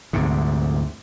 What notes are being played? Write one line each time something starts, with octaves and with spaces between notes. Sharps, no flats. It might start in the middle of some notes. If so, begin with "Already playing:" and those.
D2 G#2 C3